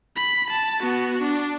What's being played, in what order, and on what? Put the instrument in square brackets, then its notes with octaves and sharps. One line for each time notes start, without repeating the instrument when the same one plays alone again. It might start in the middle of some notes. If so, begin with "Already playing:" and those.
[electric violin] B5
A5
B3 F#4
D4